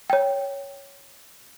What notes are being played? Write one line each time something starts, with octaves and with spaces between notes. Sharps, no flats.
C#5 G5